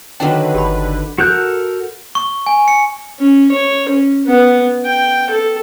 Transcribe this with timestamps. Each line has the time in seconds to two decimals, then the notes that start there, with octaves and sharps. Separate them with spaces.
0.20 D3 D#3 F#3 D4 B4 G5
0.54 G1 G4 B5
1.18 F#4 A4 A#4 F#6 G6
2.15 C#6
2.46 G#5
2.68 C#7
3.19 C#4
3.51 C#5
3.88 C#4
4.25 B3
4.85 G5
5.30 A4